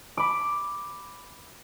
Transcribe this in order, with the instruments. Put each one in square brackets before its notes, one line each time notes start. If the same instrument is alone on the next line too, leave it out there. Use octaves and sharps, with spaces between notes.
[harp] B5 D6